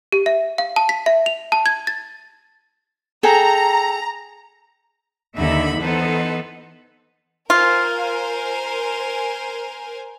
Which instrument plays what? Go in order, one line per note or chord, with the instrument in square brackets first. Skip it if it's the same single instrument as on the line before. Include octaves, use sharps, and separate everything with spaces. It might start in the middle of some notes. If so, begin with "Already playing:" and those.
[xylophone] G4
E5
F5
A5
B6
E5
F7
A5
G#6
A6
[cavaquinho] G#4 A4 G5 [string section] A#5
[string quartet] D#2 B5 [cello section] D3 D#4 E5
[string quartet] E3 B3 [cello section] D#4 A4 C5
[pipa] F4 [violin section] A#4 C5 G#5